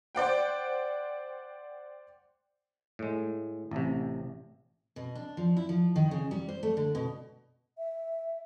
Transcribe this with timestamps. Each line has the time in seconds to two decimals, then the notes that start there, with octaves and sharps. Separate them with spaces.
0.15 C5 D5 F#5 G5
2.99 A2 G#3
3.71 A1 C3
4.96 B2
5.15 D4
5.37 F3
5.57 E4
5.69 F3
5.96 D#3
6.11 C#3
6.31 G3
6.48 C5
6.63 A3
6.77 D3
6.95 B2
7.77 E5